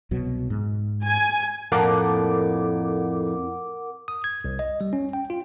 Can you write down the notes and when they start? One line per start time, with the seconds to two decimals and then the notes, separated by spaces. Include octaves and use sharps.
0.11 C2 B2 F#3
0.50 G#2
1.06 G#5
1.72 F2 A2 A#3 A#4 F#5 D6
4.08 D#6
4.24 G#6
4.44 C2
4.59 D#5
4.81 G3
4.93 C#4
5.13 G5
5.30 F4